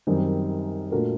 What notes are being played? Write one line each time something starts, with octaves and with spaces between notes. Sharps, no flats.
F#2 D#3 G3 C4
A#2 A3 D4 F#4 A#4